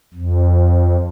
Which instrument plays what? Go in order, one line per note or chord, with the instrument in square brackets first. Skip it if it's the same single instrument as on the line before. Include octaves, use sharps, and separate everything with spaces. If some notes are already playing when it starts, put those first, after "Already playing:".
[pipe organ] F2